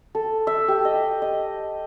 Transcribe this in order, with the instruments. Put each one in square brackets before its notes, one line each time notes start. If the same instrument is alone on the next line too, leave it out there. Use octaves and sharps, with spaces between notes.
[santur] A4
E5
G4
D#5
D#5